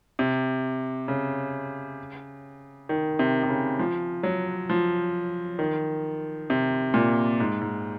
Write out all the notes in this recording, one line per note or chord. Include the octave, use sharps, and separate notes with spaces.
C3
C#3
D#3
C3
C3
C#3
F3
F#3
F3
D#3
C3
A#2
G#2
G#2